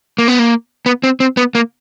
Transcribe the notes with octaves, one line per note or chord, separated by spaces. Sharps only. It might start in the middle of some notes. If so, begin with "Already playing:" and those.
A#3
B3
A#3
B3
C4
C4
B3
A#3